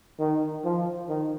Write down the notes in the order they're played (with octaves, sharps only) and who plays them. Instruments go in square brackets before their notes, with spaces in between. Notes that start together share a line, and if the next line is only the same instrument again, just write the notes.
[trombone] D#3
F3
D#3